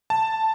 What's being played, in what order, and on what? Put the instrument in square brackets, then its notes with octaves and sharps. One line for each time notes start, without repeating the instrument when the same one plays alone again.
[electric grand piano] A5